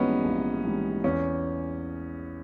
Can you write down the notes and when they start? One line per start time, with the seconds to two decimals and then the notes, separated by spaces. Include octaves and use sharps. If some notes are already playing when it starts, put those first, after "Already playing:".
Already playing: A#1 G#2 E3 G3 B3 C#4 D#4
0.24 A#1
0.64 G#2 E3 G3
1.04 E2 C#4